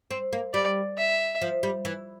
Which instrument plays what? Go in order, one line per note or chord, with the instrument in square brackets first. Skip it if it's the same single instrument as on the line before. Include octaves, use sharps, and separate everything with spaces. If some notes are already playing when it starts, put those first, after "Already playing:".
[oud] C4
A#3
[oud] G3 [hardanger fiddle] D5
[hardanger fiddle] E5
[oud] F3
G3
E3